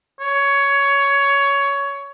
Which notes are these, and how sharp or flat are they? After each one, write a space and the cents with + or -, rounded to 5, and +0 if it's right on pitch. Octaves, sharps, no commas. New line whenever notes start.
C#5 +15